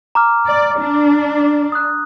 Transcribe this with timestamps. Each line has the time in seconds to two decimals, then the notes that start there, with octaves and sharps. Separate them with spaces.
0.15 A#5 D6 F6
0.47 D5
0.80 D4
1.72 D#6 F#6